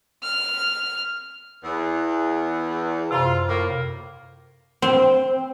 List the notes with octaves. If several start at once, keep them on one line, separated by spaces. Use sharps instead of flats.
F6
E2
F#2 C3 F4
A2 A#3
C4